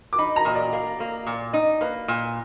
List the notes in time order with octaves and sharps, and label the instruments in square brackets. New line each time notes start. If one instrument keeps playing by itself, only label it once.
[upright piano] D6
[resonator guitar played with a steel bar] D#4 [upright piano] B5
[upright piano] A#5
[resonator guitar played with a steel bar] A#2 [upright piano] D#5
[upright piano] D5
[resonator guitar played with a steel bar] A#3
A#3
A#2
D#4
[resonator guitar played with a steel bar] A#3 [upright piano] B4
[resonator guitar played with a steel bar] A#2